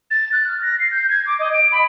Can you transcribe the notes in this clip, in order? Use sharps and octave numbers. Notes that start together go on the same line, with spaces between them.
A6
F#6
F6
A#6
C7
G6
G#6
D6
D#5
D7
B5